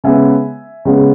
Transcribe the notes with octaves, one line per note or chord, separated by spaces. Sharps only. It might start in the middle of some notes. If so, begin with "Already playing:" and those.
C#3 G#3 B3 E5 G#5
C#3 G#3 B3